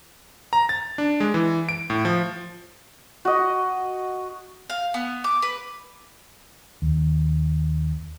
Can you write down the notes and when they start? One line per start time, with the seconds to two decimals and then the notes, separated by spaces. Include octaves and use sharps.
0.53 A#5
0.69 A6
0.98 D4
1.20 G#3
1.34 E3
1.69 D7
1.90 A2
2.05 F3
3.25 F#4 D#5
4.70 F5
4.94 B3
5.24 D6
5.42 B4
6.82 D#2